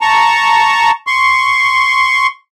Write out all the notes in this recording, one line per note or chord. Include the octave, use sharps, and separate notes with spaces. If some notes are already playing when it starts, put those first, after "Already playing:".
A5 A#5 C#6
C6 C#6